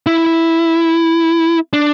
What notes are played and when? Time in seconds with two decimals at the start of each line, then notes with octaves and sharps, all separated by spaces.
0.07 E4
1.73 D4